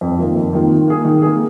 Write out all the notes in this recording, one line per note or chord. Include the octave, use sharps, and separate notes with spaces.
F2
D#3 A#3 F4
F2
D#3 A#3 F4
D#3
A#3 G#4
D#3
A#3 G#4